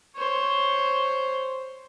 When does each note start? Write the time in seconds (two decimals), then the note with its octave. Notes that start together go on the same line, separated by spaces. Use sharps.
0.16 C5 C#5